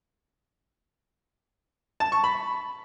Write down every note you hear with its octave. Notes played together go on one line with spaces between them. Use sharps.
A5
C#6
B5